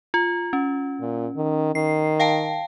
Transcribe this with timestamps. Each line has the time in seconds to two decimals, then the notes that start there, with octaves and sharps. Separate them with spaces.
0.14 F4
0.53 C#4
1.01 A#2
1.36 D#3
1.75 D#3 C7
2.20 F5 G5 A5